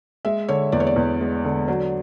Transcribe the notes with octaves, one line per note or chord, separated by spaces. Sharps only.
G#3 E5
D3 C#5
E2 D5
C#5
D5
E2
G#3
D3
F#3